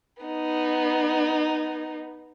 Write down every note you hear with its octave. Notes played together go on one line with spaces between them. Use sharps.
B3 D#4